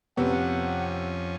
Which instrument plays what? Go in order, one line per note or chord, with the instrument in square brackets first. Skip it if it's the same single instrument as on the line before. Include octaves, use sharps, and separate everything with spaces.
[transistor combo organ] F2 C#4 [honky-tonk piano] C3 [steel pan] B3 [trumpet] F#5